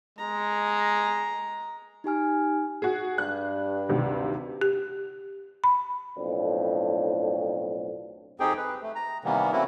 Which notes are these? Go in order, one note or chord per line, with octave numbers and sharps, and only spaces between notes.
G#3 A#5
D#4 G4 G#5 F6
F#4 G#4
G2 F#6
D2 C3 D#3
G4
B5
B1 F2 A2 D4
F2 C4 D#4 G4 G#4 G5
B4
A3
A#5
C3 D#3 E3 G3 A#3 B3
A3 A#3 C4 C#4 E4 F#4